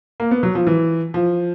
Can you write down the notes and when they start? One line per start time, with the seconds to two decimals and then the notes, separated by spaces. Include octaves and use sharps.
0.20 A#3
0.31 B3
0.43 F#3
0.55 F3
0.67 E3
1.14 F3